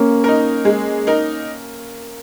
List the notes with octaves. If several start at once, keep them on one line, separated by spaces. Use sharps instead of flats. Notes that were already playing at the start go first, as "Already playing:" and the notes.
Already playing: A#3 C#4
D#4 A#4
G#3
D#4 A#4